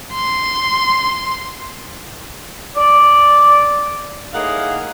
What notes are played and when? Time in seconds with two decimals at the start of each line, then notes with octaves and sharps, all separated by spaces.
0.13 C6
2.76 D5
4.33 A2 A#3 D#4 G#4 F5 F#5